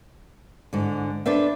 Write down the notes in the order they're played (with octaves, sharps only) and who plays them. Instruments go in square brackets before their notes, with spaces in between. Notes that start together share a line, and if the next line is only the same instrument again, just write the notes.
[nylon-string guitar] G#2 D3
D4 A4 B4 C5 E5